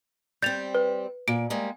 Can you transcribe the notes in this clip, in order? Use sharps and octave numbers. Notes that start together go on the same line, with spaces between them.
G3 C4 G6 A6 F7
B4
A#2 D7
G3 G#3 A#3